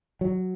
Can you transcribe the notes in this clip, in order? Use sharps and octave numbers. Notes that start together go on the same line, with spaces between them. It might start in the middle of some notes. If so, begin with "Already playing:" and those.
F#3